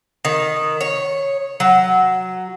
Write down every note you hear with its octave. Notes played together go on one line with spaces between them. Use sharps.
D#3
C#5
F#3